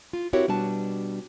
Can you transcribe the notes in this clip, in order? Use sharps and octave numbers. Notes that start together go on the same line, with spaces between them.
F4
C4 E4 F#4 G4 A#4 C#5
B2 G3 B3 D4 F#4 A5